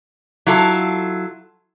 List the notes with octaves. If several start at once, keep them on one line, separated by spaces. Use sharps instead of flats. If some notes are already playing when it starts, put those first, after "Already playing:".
F#3 E4 F4 A4